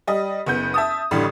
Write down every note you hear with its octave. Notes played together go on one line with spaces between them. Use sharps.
G3 D#5
F#1 B3 G6
E5 A5 D#6
A1 A2 D3 G3